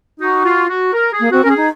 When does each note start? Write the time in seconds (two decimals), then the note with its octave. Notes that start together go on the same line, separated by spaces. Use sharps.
0.20 D#4 F#4
0.44 F4
0.69 F#4
0.93 A#4
1.12 G#4
1.20 A#3
1.31 C4 F#4
1.43 C#4 A#4
1.49 G#4
1.56 D#4